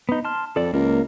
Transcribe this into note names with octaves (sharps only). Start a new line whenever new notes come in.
B3 D#4
A5 C6 F6
F2 A4 D5
C#2 A#3 A#4